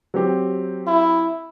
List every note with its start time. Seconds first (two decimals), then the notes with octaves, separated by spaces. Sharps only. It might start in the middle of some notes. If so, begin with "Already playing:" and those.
0.14 F#3 C4 G4
0.87 E4